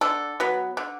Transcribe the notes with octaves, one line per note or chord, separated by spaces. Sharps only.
D3 A4
F#3 B3
D3